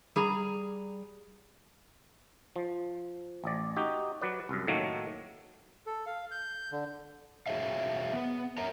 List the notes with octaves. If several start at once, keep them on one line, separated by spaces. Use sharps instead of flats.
G3 G#4 A#5
F3
A1 D5
D#4 F#4 G4
F#3 B4 D5
C2 F#2
A2 D#3 F#3 A3 A#3
A4
F5
G6
D3
F#4 G#4 C#5 E5 F5
B3
A#4 C#5 E5 A#5